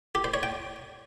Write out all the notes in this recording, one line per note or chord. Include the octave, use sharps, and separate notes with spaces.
G4
C5
C#5
G5